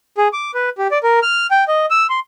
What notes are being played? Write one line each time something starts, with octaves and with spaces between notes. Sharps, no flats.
G#4
D6
B4
G4
D5
A#4
F6
G5
D#5
E6
C6